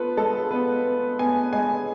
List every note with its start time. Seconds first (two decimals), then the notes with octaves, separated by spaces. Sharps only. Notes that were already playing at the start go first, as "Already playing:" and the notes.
Already playing: B3 F4 A4 B4
0.17 G#3 A4
0.51 B3 B4
0.85 B3
1.19 B3 G#5
1.53 G#3 G#5